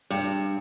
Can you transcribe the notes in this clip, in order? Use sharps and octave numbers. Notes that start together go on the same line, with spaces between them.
G2